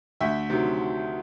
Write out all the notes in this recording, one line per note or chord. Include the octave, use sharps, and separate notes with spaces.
D2 E5
C3 D#3 F#3